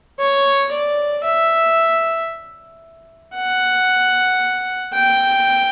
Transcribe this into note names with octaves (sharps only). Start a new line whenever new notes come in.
C#5
D5
E5
F#5
G5